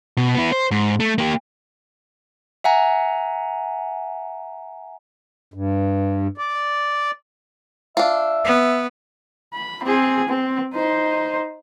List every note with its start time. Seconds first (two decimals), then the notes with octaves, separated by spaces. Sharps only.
0.17 B2
0.35 B3 E4
0.52 C5
0.71 G#2
1.00 A3
1.18 A#3 G4
2.64 E5 F#5 G#5 A#5
5.54 G2
6.38 D5
7.97 D4 F4 E5
8.45 B3
9.54 B5
9.83 C4 G#4
10.28 C4
10.74 D#4 C5